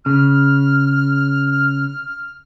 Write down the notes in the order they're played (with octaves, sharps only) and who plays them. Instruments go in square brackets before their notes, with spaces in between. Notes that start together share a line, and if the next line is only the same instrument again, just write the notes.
[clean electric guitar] C#3 [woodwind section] F6